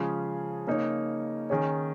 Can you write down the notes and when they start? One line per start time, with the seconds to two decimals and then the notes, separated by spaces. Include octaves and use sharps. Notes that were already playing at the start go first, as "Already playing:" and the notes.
Already playing: C#3 F3 G#3 C#4 G#4
0.67 C#3 A#3 D#4 C#5
1.50 D#3 C#4 G#4 C#5